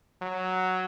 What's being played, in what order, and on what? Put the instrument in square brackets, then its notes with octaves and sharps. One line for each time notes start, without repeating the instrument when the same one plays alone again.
[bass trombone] F#3